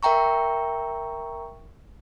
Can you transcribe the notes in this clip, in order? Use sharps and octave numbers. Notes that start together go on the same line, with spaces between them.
A#4 E5 G5 A#5 C#6